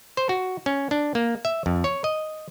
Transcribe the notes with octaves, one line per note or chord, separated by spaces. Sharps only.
C5
F#4
C#4
D4
A#3
E5
F2
C#5
D#5